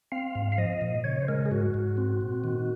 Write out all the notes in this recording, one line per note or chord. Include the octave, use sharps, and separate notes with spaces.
C4 F5
G#2
F5
F3 D#5
A#2
C#3 C#5
C5
G#3 A#4
G#4
G#2 F#4
G#2
C4
A#2
D#3